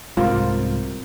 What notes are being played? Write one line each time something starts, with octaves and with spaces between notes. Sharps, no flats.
C2 G#2 G3 C4 F4 A#4